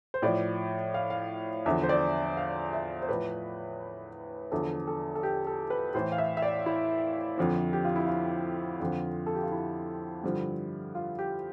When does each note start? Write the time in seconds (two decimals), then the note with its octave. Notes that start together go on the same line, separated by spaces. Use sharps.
0.14 C5
0.22 A2 F3 D5
0.94 F5
1.10 F5
1.66 E2 D3 F3 E5
1.83 C5
1.89 D5
2.37 F5
2.73 E5
3.02 C5
3.09 A2 F3 B4
4.51 E2 D3 F3 A4
4.87 A4
5.15 A4
5.23 G4
5.47 A4
5.70 B4
5.94 A2 E3 C5
6.12 F5
6.18 E5
6.37 E5
6.42 D5
6.66 E4
7.38 F2 D3 F3
7.73 G4
7.85 F4
7.96 E4
8.07 F4
8.81 F2 D3 F3
9.26 A4
9.35 G4
9.43 F4
9.52 E4
10.23 G2 D3 F3
10.95 F4
11.19 G4